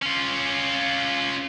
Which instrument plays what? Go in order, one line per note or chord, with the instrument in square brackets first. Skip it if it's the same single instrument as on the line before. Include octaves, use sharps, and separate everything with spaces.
[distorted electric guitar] C#4 F4